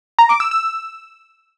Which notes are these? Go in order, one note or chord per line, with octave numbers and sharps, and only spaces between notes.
A#5
D6
E6
E6